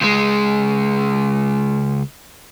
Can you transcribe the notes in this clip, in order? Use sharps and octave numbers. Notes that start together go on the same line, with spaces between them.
C#2 G#3